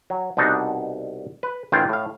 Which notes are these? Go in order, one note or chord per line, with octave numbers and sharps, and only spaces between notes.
F#3
C2 B2 D4 D#4 F#4
B4
A1 D#3 E3 F4 F5 G5
A2 F5